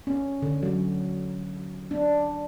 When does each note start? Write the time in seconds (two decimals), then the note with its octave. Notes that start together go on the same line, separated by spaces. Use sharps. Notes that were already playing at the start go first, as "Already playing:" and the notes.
0.07 C#4
0.42 D3
0.63 F#3
1.91 D4